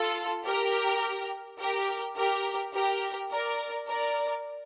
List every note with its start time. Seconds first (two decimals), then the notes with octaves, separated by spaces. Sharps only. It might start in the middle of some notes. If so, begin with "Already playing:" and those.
Already playing: F4 A4
0.45 G4 A#4
1.59 G4 A#4
2.17 G4 A#4
2.74 G4 A#4
3.32 A#4 D5
3.89 A#4 D5